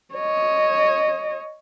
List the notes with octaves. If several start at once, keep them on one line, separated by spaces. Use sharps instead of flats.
C#5 D#5